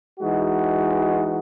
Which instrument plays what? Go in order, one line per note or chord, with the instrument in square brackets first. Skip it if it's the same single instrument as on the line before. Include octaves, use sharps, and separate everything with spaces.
[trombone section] E3 G#3 D#4 F#4